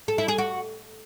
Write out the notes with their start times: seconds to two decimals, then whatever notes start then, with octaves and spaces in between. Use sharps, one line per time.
0.08 A4
0.18 E4
0.28 G#4
0.38 F#4